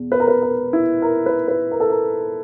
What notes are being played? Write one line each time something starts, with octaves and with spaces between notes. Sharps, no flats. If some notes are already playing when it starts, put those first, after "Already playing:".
Already playing: E2 B2
B4
A#4
B4
A#4
E4
A#4
B4
B4
A#4
A4
A#4